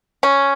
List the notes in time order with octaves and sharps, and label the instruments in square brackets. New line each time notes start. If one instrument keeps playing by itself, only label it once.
[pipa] C#4